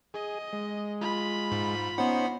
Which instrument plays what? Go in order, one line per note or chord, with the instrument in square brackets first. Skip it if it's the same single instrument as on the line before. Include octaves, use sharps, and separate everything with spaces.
[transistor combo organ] G#4 [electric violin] D#5
[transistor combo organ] G#3
[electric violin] F4 B5
[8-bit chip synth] G#2
[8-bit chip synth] B3 F#5 [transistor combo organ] C#4 D#4 C5